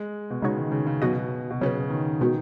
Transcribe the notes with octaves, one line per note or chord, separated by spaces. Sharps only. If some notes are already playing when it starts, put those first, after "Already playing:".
Already playing: G#3
B2
C#3 G#3 B3 D#4 F#4 C#5
D#3
C#3
C#3
B2 F#3 B3 F#4 D#5
B2
C#3 F#3 C#4 B4
D#3
B2 D#3 G#3 B3 F#4